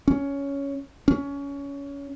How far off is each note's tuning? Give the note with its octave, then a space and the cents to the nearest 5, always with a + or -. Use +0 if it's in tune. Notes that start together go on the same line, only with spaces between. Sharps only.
C#4 +10
C#4 +20